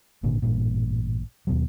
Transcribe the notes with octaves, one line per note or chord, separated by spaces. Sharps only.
G#1 A#2 D3
A1 G2 A#2
D#2 B2 F#3